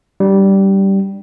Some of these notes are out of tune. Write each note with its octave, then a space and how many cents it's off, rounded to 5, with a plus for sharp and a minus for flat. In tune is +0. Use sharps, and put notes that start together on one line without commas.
G3 -10 D4 +0